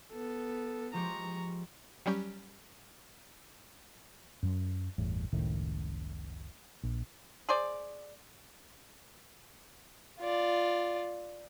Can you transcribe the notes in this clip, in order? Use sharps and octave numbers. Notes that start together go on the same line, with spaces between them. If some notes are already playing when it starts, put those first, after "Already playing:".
B3 A4
F3 G#3 G4 A#5 C#6
F#3 G3 C#4 G4
F#2 F#3
G1 E2 A2
F#1 C#2 A2 D#3
A#1
G#4 C5 D5
F4 D5